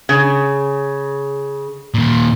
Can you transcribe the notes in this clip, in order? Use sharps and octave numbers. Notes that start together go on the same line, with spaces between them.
C#3
A#2 D#3